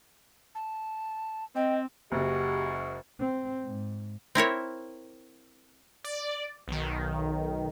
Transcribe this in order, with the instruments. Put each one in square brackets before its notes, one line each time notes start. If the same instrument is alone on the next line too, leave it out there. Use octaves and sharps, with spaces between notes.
[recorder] A5
[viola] C4 [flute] D#5 [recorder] G5
[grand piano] F#1 [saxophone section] F#2 G#3 F#4 [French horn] G4
[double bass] C4
G#2
[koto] C4 E4 A#4 C#5
[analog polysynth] D5
B1 D#3